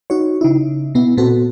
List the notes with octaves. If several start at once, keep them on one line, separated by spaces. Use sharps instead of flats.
D#4 F#4 C#5
C#3 D#4 E4
B2 B3 E4
A#2 B3 C4 F#4 A4